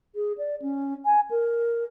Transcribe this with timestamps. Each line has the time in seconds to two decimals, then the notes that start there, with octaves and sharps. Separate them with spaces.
0.15 G#4
0.38 D5
0.62 C#4
1.05 G#5
1.31 A#4